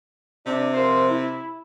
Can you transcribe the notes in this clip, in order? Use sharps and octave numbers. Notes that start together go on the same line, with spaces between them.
C3 D4
F3 A#4 C5
E4